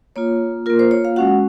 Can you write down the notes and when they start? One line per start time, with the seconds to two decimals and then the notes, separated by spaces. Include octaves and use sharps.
0.16 A#3 F4 C#5
0.66 A#3 F4 A#4
0.79 C5
0.91 C#5
1.05 F5
1.16 G#3 C#4 F#4 F#5